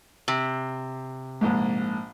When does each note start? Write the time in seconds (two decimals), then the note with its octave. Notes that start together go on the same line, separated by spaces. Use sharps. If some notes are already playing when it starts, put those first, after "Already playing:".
0.28 C3
1.41 A#1 G#2